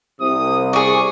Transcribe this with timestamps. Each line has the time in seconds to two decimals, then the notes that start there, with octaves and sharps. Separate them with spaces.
0.21 C2 C3 D#6
0.73 G#4 D5 C#6